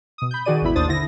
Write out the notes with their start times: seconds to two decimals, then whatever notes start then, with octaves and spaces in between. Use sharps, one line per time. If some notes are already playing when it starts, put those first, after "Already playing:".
0.18 B2 D#6
0.31 B5 G6
0.45 D#3 F#4 G#4 D5 D#7
0.62 G#1 E2 B2 E4 B5
0.76 D#2 D4 C5 D#6 A6
0.88 D3 E4 A#6